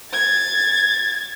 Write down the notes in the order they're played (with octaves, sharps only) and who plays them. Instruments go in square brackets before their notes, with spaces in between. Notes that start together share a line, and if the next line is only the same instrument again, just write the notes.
[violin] G#6 A6